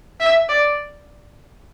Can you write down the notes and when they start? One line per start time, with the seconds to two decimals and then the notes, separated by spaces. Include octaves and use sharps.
0.20 E5
0.49 D5